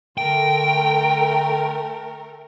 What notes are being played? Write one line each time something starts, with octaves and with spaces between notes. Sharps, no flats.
D3 A3 A#4 G5